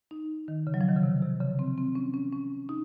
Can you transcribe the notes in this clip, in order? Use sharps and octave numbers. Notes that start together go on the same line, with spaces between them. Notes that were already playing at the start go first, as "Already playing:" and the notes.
D#4
D#3
C#3
F#3
F3
D#3
C#3
C3
C3
C#3
C4
C4
C#4
C#4
C#4
D#4